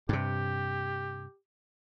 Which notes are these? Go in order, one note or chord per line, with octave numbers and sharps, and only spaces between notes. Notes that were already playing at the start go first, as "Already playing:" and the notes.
G2 C3 G4